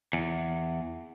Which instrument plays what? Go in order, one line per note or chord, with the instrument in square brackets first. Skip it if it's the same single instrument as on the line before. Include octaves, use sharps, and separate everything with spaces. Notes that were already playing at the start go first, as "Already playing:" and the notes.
[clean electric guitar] E2